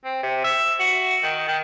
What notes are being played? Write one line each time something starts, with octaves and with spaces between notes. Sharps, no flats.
C4
C3
E5
F#4
D#3
D#3